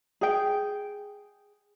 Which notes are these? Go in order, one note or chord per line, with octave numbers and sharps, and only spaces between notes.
G#4 G5